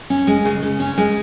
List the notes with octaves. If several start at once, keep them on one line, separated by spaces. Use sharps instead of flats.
C#4
G#3
C#3
C#3
C#4
G#3